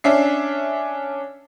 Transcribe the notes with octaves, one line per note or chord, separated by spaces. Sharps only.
C#4 D4 E5 C7